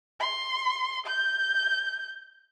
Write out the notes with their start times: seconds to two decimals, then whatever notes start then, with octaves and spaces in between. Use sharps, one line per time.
0.20 C6
1.06 G6